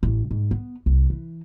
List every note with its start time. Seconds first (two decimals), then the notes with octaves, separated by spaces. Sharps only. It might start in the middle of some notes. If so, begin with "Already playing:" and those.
0.03 A1
0.31 G#2
0.51 B3
0.86 C2
1.10 E3